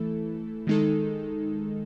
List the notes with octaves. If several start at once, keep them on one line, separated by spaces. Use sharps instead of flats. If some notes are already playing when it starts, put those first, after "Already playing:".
Already playing: E3 A3 E4 A4
D#3 G#3 D#4 A4